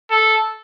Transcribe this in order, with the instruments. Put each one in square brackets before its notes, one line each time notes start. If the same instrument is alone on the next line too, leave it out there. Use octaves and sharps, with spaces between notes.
[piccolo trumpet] A4